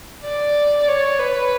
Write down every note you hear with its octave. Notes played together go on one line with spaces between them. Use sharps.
D5
C#5
B4